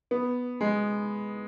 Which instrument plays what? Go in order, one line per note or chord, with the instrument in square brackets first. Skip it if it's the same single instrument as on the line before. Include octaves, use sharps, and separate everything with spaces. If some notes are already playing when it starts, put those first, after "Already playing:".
[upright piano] B3
G#3